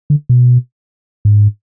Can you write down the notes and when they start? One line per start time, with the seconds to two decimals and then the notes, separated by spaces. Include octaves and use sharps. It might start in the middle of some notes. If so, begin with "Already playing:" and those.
0.10 D3
0.29 B2
1.25 G#2